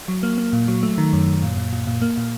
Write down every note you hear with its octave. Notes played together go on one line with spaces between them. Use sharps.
F#3
A#3
A#3
A#2
F#3
A3
D#3
F#2
F#2
A#2
A#2
A#2
A#2
A#3
A#2